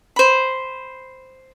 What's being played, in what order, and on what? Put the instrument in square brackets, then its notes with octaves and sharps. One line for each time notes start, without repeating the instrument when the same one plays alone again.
[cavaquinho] C5 B5